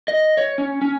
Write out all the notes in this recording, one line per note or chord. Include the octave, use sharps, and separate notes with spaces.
D#5
C#5
C#4
C#4